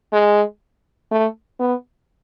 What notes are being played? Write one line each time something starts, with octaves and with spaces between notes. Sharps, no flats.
G#3
A3
B3